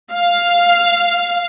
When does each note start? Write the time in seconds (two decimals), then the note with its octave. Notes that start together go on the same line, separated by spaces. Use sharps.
0.12 F5